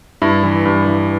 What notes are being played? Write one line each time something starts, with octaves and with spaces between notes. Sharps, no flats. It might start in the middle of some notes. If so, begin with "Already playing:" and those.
G2 E4
E3
G2
E3